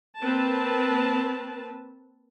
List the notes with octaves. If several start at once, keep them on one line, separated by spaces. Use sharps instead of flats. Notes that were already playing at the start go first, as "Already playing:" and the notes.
A#3 C4 B4 A5